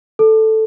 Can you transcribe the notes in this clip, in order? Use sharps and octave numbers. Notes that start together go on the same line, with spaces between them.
A4